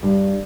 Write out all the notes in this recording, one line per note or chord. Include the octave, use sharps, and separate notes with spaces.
G2